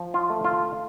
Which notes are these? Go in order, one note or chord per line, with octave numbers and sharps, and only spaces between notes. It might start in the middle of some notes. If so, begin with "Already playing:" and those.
Already playing: F3
F4
A3
F4